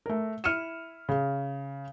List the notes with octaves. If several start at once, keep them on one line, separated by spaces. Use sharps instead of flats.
A3 A#4
E4 F6 C#7 D#7 E7
C#3